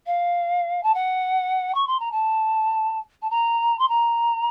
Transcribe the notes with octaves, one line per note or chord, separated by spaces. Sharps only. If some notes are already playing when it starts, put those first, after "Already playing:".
F5
A5
F#5
C#6
C6
A#5
A5
A5
A#5
C6
A#5